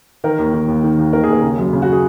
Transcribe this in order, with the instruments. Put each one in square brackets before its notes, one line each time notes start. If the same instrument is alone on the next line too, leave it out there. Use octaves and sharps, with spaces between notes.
[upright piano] D#3 A#4
D#2
D#3
D#2
D#3
D#2
D#3 A#4
G#4
D#2 A#4
C#3
F#2
C#3
F#4
G#4